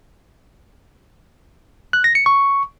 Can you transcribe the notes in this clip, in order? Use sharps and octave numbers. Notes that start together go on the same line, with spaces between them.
F#6
A#6
C#7
C#6